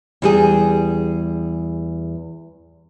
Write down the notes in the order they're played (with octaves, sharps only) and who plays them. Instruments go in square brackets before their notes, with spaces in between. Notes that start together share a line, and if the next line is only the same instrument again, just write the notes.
[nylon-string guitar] E2 G3 G#4